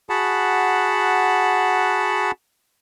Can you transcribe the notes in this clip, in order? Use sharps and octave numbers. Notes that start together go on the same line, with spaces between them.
F#4 G#4 F#5 A5 B5